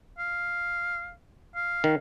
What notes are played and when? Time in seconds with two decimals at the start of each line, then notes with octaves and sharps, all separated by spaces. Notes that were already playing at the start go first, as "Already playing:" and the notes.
0.19 F5
1.55 F5
1.84 D#3